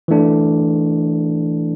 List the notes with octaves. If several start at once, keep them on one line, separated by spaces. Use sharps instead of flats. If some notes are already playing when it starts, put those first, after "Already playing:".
E3 A3 D4